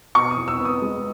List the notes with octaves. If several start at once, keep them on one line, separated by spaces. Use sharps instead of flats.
B2 C#6
D#6
E2
E6
B3
D#6
G#3